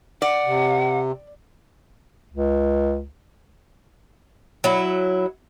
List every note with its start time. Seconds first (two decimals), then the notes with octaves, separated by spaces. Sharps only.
0.22 D5 F#5
0.46 C3
2.31 C#2
4.64 F#3 E4